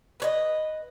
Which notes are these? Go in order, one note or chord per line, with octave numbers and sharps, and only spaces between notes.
B4 C#5 D#5